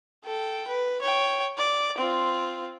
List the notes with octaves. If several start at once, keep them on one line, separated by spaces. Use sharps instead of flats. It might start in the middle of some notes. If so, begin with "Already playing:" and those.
A4 G5
B4
C#5 G5
D5
C4 F4